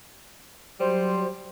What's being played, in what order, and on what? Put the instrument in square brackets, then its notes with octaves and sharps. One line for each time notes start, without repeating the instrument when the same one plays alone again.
[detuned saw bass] F#3 [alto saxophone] G3 [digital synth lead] C5